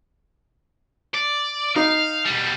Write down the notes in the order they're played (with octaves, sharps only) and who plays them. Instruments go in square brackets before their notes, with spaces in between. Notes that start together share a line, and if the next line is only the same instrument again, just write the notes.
[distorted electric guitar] D5
[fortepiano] D#4 [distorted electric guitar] F5
[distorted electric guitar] B2 G3